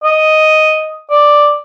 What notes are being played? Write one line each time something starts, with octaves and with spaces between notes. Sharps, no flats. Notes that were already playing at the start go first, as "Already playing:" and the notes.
D#5
D5